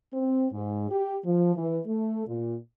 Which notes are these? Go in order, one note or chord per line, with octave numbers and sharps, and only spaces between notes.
C4
G#2
G4
F3
E3
A3
A#2